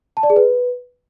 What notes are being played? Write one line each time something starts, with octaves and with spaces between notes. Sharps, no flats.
A5
D5
G#4
B4